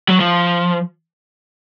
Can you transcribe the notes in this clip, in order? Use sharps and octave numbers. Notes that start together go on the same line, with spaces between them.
F#3
F3